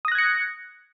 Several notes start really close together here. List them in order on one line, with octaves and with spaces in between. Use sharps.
D#6 A#6 F#6 G#6 C#7